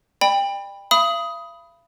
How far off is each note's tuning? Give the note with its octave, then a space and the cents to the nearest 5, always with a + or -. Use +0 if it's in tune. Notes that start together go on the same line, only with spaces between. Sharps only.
D5 +30 G5 +25 B5 +0
F5 -45 B5 +0 D#6 +15